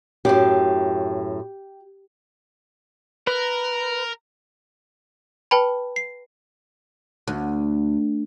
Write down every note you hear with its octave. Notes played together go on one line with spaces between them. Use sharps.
F#2 A2 G4
A#4 B4
B4 G5 A5 B5
C7
D2